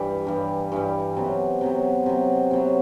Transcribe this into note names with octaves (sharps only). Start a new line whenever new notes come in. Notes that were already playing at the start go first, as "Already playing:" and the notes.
Already playing: G2 E3 G3
G2 E3 G3
G2 E3 G3
C3 F#3 B3
C3 F#3 B3
C3 F#3 B3
C3 F#3 B3